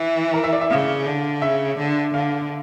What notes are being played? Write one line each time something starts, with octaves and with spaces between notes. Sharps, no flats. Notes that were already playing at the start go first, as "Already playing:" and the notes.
Already playing: E3
A#4
E5
D5
E5
C#3 F5
D3
C#3 E5
D3
D3 F5